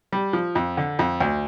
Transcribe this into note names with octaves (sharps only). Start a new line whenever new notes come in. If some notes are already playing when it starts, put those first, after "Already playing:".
G3
F3
F2
D3
F2
D2